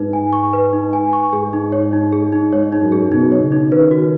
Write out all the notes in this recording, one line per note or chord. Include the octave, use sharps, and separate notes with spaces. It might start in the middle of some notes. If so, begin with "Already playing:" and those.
Already playing: G#2 D#4 B4
G#5
C#6
B4
D#4
G#5
C#6
G#2 G#4
D#4
C#5
D#4
G#4
D#4
G#2 C#5
D#4
F#2
G#4
B2 D#4
C#5
C#3
D#4
D#3 B4
F#4